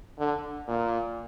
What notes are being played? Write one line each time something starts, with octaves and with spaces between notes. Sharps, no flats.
D3
A#2